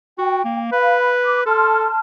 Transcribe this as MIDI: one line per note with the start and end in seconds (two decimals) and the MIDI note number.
0.18 0.41 66
0.18 0.57 79
0.45 0.67 58
0.72 1.41 71
0.72 1.10 77
0.72 1.10 83
1.26 1.39 86
1.46 1.87 69
1.46 1.99 81
1.46 1.99 84
1.46 1.99 89